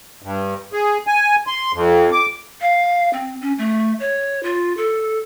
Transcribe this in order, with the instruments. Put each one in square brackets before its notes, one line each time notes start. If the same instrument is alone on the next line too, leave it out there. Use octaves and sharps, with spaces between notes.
[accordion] G2
G#4
G#5
C6
F2
D6
[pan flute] F5
C4
C#4
A3
C#5
F4
A4